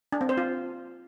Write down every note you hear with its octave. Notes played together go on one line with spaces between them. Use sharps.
D4
C4
C5
F4